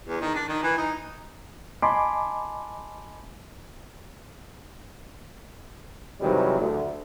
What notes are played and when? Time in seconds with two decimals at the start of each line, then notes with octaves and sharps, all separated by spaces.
0.07 E2
0.21 D#3
0.35 D4
0.49 D#3
0.63 E3
0.78 D#4
1.82 D#5 G#5 A5 B5 C6 D6
6.21 G#2 C3 D#3 E3 F#3 G3
6.60 D2